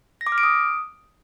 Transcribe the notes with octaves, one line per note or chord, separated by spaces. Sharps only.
A#6
D6
F6
D7
D#6